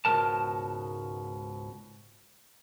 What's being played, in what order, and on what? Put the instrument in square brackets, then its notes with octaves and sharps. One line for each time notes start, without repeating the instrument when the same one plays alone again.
[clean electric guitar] C#2 G#2 B2 D#3 A#4 A5